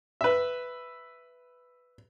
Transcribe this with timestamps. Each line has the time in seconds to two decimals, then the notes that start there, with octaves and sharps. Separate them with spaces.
0.21 B4 E5